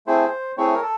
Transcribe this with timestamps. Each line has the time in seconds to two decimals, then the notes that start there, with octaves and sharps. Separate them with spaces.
0.07 A3 C4 E4 G#4 C5
0.57 A3 C4 E4 G#4 C#5
0.73 A#4
0.82 A4